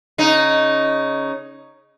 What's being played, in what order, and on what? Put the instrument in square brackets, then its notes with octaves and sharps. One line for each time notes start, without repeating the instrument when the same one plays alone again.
[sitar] C#3 D#4